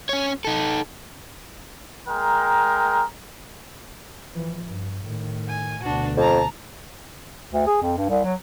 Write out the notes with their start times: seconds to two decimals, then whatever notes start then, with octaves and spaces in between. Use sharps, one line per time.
0.09 C#4 C#5
0.45 D#4 A4
2.09 G#3 A#4 G5 A#5
4.35 E3 F3
4.65 G2
5.02 A2 D#3
5.48 G#5
5.83 D2 B2 D4 F#4
6.17 F2 A5 A#5
7.53 D2
7.67 G#4
7.82 F2
7.97 G2
8.09 C2
8.24 F#3